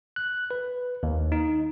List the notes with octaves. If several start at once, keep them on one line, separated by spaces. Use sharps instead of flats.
F#6
B4
D#2
D#4